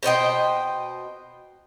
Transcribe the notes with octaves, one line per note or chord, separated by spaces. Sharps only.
B2 C5 D#5 G5